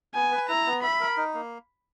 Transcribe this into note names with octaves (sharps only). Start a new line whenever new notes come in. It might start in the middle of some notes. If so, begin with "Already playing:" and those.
B3 G#5
B4
E4 A#5
B3
E5 B5
A#4
D#4
A#3